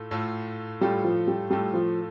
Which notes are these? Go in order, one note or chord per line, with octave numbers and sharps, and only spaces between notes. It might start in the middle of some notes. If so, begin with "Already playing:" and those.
Already playing: A2 A3 F4
A2 A3 F4 A4
A2 G3 A3 F4 A4
F3
G3
A2 G3 A3 F4 A4
F3